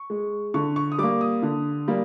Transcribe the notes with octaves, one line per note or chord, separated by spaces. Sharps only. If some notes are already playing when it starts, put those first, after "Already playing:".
Already playing: C#6
G#3
D3 C#6
C#6
D#6
G3 A#3 D6
D#6
D3
G3 A#3